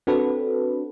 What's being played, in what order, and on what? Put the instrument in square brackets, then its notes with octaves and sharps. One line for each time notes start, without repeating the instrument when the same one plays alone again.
[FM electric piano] C4 D4 F#4 A4 B4